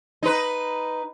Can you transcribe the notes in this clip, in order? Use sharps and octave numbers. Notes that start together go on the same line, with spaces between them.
D#4 B4